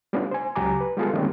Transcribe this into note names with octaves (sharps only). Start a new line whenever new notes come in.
G3 A3 B3 C#4 D4 F4
C5 G#5
C#2 F#3 G4 G#5 A#5 D6
B4
G3 G#3 B3 F4 G#4 A4
D#3 G3 G#3 A#3 C4 C#4